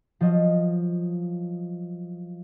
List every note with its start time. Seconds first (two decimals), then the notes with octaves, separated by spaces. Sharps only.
0.21 F3 F#3 F4 D#5